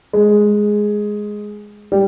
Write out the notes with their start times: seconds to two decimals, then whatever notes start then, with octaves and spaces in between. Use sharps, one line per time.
0.13 G#3
1.92 G3